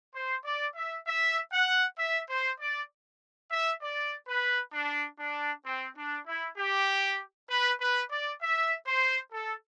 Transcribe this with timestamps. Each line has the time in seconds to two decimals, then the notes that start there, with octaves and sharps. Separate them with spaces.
0.15 C5
0.45 D5
0.76 E5
1.07 E5
1.52 F#5
1.99 E5
2.30 C5
2.60 D5
3.52 E5
3.83 D5
4.28 B4
4.73 D4
5.19 D4
5.66 C4
5.97 D4
6.27 E4
6.58 G4
7.50 B4
7.81 B4
8.11 D5
8.42 E5
8.87 C5
9.33 A4